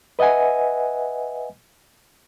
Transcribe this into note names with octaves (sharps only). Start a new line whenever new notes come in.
B4 D#5 E5 F#5 G#5